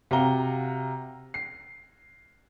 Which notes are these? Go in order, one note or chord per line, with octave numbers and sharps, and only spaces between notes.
C3 F#4 F5 F#5 A#5 G7
C7